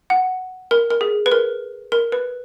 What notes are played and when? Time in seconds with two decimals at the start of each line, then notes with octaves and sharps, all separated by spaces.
0.10 F#5
0.71 A#4
0.90 A#4
1.01 G#4
1.26 B4
1.32 A#4
1.92 A#4
2.12 B4